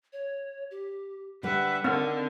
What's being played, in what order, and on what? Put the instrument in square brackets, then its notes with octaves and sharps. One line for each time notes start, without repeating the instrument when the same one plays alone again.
[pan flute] C#5
G4
[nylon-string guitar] D3 G3 [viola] B4 E5 [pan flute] F#5
[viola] D3 [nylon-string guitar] D#3 [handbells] C4